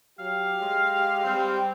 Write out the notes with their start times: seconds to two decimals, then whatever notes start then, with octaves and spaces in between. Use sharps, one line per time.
0.19 F#3 G4 F5
0.62 G#3
1.24 G3 C4